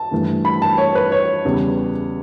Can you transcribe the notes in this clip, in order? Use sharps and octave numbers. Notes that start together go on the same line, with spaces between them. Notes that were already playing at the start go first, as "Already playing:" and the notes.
Already playing: A5
G2 E3 A3
B5
A5
C#5
B4
C#5
E2 C#3 G3